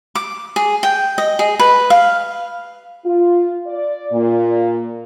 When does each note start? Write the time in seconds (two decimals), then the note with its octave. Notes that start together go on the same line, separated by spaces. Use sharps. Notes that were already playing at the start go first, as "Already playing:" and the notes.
0.15 D6
0.56 G#4
0.83 G5
1.18 D#5
1.39 G#4
1.59 B4
1.90 F5
3.05 F4
3.67 D5
4.12 A#2